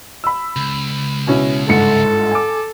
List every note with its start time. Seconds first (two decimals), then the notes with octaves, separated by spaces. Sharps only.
0.24 B5 E6
0.56 C#2
1.27 B2 C#4 E4
1.68 G1 G#2 A4 C#7
2.31 G#5 D6